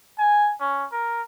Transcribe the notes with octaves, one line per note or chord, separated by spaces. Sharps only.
G#5
C#4
A#4